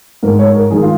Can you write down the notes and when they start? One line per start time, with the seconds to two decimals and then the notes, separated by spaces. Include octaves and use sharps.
0.23 G#2 G#3 A#4
0.39 C#5
0.55 A#4
0.70 D#3 G#3 G#4
0.82 F4